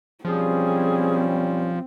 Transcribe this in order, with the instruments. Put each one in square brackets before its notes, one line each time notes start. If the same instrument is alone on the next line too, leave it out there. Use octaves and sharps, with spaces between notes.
[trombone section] B1 G3 C#4 [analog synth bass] F3 [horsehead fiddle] C4 [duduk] G#4